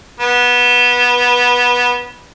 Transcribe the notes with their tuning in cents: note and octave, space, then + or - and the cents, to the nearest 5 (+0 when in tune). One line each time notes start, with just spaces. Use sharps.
B3 -15